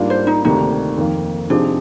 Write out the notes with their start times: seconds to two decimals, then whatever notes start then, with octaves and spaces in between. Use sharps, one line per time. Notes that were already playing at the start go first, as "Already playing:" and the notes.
Already playing: G#2 G3 A#3 D4 F4
0.10 C5
0.27 D#4
0.45 D2 C3 D#3 A#3 D4 D#4
0.98 F2 D#3 A#3
1.50 C3 F3 C4 D4 D#4 G#4